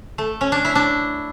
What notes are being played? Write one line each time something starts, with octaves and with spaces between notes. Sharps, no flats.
A3
C#4
D4
E4
D4